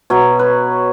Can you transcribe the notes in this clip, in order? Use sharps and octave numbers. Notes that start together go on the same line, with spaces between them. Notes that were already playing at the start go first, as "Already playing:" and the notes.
B2 F#3 C#5
B4